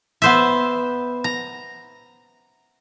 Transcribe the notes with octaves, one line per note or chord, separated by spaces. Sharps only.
B3 C5 E5
A#5